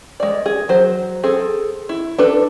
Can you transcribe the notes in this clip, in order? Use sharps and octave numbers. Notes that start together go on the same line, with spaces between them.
G#3 D5
G#4
F#3 C5
C4 G#4 A4
E4
D4 A4 B4